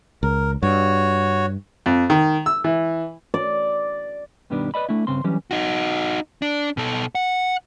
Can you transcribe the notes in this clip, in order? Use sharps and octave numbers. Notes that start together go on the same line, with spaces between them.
C#2 A#4
G2 F#4 C#5
F2
D#3
E6
E3
D5
G2 B2 D#3 G3 B3 D4
B4 D5 D#5 B5
A3 D4 E4
G2 C#3 C4 C6
E3 F#3 G3 C#4
D#4 F#4
D4
B2 A4
F#5